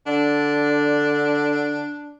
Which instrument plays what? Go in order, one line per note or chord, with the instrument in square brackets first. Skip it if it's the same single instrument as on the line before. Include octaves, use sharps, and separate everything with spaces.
[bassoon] D3 [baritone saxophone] D4